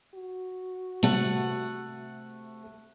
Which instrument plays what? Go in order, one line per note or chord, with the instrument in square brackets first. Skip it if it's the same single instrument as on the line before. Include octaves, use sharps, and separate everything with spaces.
[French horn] F#4
[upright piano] C3 [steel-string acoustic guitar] A3 F#5